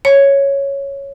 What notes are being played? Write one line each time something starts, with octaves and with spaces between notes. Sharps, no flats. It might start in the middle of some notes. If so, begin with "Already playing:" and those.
C#5